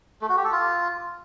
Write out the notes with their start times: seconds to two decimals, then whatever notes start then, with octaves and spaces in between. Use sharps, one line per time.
0.22 A3
0.29 F#4
0.37 G4
0.45 A4
0.52 F4